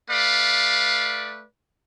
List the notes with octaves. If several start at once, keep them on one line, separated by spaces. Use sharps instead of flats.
A3 B4 D5 F5